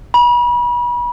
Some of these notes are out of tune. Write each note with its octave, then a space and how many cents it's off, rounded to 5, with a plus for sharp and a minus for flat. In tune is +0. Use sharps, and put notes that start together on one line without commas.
B5 -35